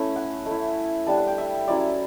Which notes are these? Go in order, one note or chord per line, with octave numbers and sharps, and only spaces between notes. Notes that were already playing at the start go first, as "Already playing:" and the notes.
Already playing: A3 C#4 E4
F#5
A3
E4
G3 D4 A5
F#5
G5
E5
F#3 C#4 E4 D5